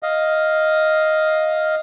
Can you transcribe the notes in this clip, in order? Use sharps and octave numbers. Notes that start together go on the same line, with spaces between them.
D#5 F5